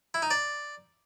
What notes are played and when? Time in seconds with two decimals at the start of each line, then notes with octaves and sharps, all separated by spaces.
0.14 E4
0.22 D#4
0.30 D5